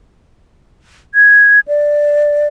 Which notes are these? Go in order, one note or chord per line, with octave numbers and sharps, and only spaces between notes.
G#6
D5